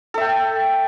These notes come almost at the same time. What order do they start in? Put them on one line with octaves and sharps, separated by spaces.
A4 E5 G5